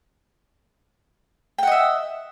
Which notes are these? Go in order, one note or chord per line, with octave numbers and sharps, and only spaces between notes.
D#5 E5 F#5 G5